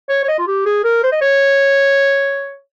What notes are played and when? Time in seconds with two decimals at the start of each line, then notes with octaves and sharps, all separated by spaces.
0.09 C#5
0.23 C#5
0.28 D#5
0.39 F4
0.47 G4
0.66 G#4
0.84 A#4
1.03 C5
1.12 D#5
1.21 C#5